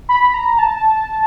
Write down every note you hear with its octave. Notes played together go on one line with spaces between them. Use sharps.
B5
A#5
A5